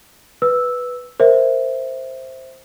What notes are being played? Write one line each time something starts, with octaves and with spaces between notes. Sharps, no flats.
B4 E6
A#4 C5 E5